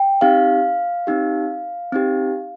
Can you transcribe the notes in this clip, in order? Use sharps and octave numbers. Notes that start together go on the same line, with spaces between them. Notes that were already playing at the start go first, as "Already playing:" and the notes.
Already playing: G5
C4 D#4 G4 F5
C4 D#4 G4
C4 D#4 G4